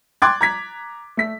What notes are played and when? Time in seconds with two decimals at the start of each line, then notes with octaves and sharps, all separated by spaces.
0.22 G5 C6 D6 F#6 G#6 A6
0.41 A#5 G#6 B6
1.17 A3 B6